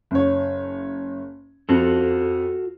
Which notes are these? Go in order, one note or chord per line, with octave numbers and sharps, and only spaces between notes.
F#1 C#5
F2 F4 F#4 A4